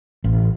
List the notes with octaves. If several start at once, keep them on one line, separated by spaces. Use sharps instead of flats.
A1